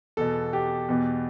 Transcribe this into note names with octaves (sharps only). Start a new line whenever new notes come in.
E2 B2 A4
G4
E2 B2